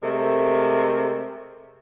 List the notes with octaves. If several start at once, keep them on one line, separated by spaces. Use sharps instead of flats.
C3 G#3 A3 A#4